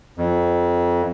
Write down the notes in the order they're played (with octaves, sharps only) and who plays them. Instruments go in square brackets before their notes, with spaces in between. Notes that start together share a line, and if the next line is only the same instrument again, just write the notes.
[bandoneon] F2